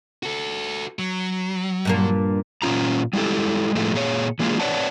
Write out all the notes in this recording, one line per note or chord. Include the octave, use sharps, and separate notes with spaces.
F#4 A4
F#3
G2 A#2 A#3
A#2 D#3 C#4 F4 A#5
G3 G#3 E4 G4 A4
A2 F3 G#3 A3
A#2 G#4 C#5
E3 G#3 A#3 C4 F4 G#4
B4 C#5 D5 F#5 A5